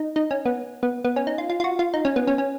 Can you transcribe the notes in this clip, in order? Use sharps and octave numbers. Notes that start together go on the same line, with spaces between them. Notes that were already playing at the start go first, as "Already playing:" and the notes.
Already playing: D#4
D#4
C#4
B3
B3
B3
C#4
D#4
F4
F4
F4
F#4
F4
D#4
C#4
B3
C#4
C#4